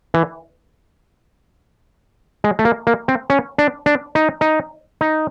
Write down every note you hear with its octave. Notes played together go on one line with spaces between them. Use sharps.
E3
G#3
A3
A#3
A#3
C4
C#4
D4
D4
D#4
D#4
D#4